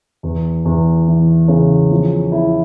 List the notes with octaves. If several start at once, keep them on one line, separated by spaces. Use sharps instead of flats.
E2
E2
E3
C#3
F3
E4